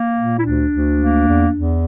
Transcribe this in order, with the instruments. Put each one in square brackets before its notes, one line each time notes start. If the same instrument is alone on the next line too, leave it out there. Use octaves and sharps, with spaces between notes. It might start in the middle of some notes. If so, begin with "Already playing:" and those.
Already playing: [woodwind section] A#3
A#2
E4
D2 D4
D2
A#3
E2
E2